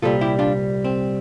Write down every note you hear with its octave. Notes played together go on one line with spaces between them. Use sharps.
C2 A#2 G3 F4 A4
E4 G4
D4 F4
C4